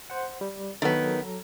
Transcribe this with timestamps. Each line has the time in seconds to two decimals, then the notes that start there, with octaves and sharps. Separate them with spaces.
0.10 C5 F#5
0.41 G3
0.82 D#3 F#3 B3 A4 A#5